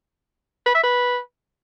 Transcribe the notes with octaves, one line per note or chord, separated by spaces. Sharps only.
B4
E5
B4